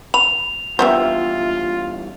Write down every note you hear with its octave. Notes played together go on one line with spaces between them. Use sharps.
B5 F7
E2 G2 G3 B3 F4 C5 E5